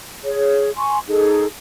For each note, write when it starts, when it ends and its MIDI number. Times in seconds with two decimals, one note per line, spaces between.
0.24 0.70 68
0.24 0.70 73
0.77 0.98 80
0.77 0.98 84
0.77 0.98 85
1.08 1.46 63
1.08 1.46 68
1.08 1.46 69